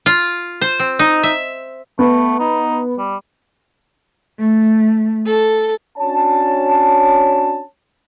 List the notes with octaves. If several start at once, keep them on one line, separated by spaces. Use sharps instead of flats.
F4
C5
C4
D#4
E5
A3 B3
D#4
G3
A3
A4
C#4 D4 F#4 C#5 A5